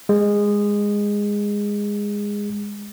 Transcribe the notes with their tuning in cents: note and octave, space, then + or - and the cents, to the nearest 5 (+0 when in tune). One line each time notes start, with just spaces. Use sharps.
G#3 -15